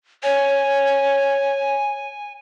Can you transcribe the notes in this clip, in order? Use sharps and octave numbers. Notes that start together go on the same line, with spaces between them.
C#5 G#5